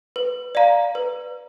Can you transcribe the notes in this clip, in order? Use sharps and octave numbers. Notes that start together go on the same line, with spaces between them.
B4
D5 F5 A#5
B4